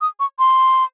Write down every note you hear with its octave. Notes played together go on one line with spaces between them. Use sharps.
D#6
C#6
C6